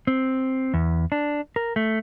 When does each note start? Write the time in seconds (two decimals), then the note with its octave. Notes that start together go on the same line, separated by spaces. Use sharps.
0.07 C4
0.74 E2
1.12 D4
1.56 A#4
1.76 A3